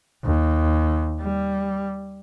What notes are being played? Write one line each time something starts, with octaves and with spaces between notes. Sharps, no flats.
D#2
G3